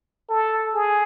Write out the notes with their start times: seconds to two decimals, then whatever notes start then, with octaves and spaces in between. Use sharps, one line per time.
0.29 A4
0.74 G#4